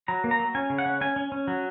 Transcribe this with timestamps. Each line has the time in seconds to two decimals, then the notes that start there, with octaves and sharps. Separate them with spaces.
0.08 F#3 A#5
0.24 A#3
0.31 A#5
0.40 F#3
0.55 C#4 G#5
0.70 C#3
0.78 F#5
0.86 C#4
1.01 C#4 G#5
1.16 C#4
1.32 C#4
1.48 F#3